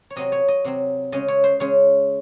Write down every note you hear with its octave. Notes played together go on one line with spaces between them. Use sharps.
C#5
C3 F#3 C4 D#5
C#5
D#5
C3 F#3 C4
C#3 G#3 C#4 D#5
C#5
C5
C#3 G#3 C#4 C#5